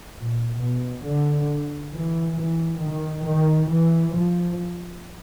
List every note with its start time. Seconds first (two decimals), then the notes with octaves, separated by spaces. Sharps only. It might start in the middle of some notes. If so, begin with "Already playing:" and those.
0.17 A#2
0.61 B2
1.06 D3
1.93 E3
2.38 E3
2.83 D#3
3.27 D#3
3.71 E3
4.15 F3